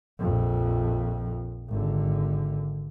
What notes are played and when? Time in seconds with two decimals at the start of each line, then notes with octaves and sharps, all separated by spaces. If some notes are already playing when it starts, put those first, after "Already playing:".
0.19 A#1 F2
1.69 G#1 D3